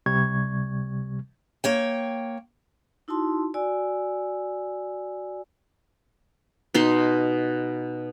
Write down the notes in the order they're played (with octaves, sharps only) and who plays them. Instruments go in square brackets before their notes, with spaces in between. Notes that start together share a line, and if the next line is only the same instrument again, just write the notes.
[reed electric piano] C#2 C3 G3 C#6 G#6
[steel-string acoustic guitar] A#3 C#5 G5
[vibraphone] D#4 E4 F#4 A5 C6
F#4 D5 G#5 E6
[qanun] B2 D#4 C6